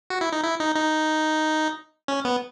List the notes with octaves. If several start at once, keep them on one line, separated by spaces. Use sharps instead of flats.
F#4
E4
D#4
E4
D#4
D#4
C#4
B3